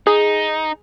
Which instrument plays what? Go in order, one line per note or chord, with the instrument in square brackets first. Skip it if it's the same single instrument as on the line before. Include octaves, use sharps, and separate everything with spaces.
[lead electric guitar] D#4 [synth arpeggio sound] G#4